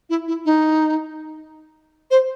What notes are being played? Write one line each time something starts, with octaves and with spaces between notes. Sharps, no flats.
E4
E4
D#4
C5